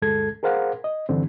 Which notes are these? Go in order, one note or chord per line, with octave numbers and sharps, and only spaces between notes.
D2 G2 G#3 A4 G#6
G#4 A#4 C5 F5 F#5
D#5
C#2 G2 D3 E3 G3 C4